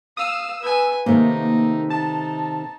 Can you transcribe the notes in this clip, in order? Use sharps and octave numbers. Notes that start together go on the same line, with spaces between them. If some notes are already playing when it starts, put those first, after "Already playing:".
F5 D#6 E6 E7
B4 G#5
C3 D#3 A3 A#3 D#4
D#4 A5